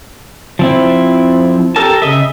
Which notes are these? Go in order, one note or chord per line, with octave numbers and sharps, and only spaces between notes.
F3 C4 E4
G4 A4 A#4 A5
C#3 D#5 E5